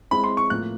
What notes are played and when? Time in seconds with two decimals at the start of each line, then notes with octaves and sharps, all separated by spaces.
0.11 G#3 C4 E4 B5
0.24 C6
0.37 C#6
0.50 A2 F3 A#3 F#6